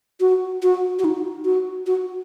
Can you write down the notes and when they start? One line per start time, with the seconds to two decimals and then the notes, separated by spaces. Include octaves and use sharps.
0.21 F#4
0.63 F#4
0.99 F#4
1.04 D#4
1.45 F#4
1.87 F#4